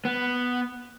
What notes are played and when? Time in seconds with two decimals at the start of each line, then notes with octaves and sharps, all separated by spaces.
0.05 B3